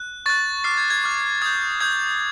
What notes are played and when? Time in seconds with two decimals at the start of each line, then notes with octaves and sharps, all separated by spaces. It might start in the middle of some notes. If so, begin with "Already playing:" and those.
Already playing: F#6
0.26 C#6 F#6 A6
0.64 D6 F6 C7
0.78 G#6
0.90 G#6
1.04 D6 F6
1.42 D#6 G6 G#6
1.81 D#6 G6 G#6